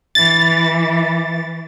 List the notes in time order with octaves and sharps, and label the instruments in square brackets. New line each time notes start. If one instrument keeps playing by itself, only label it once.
[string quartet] E3 [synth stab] A6